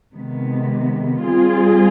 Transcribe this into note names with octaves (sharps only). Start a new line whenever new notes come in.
C3 D#3 G#3 B3
G3 C4 F4 G#4